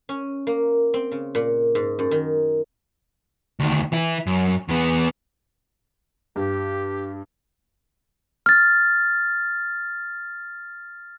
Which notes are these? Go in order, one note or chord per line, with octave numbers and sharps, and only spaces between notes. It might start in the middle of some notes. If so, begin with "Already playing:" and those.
C#4
A#3
C4
C#3
A#2
G#2
F#2
D#3
D2 D#3
E3 E4
F#2
E2 B3
G2 G4
F6 A6